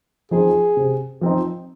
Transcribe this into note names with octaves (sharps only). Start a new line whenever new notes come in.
F3 C4 D#4 G#4
C3
F3 C4 D#4